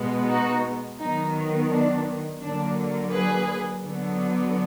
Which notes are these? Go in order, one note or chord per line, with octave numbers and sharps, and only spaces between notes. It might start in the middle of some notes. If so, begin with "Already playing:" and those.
Already playing: B2 G#3 B3
D#4 F#4
D#3 F#3 B3 D#4
D4
D3 F#3 A#3 D4
G#4 B4
D3 F#3 B3